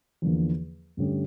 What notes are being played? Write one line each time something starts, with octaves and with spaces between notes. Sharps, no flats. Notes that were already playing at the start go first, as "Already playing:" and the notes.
E2 D3 F3 A#3
G2 D3 A3 C#4 G4